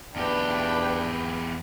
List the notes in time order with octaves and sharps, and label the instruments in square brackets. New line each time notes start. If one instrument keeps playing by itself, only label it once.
[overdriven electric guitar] E2 G4 [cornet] D4 [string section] B4 G5